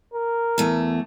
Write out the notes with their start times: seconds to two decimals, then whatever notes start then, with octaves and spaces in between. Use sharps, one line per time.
0.14 A#4
0.58 E2 A3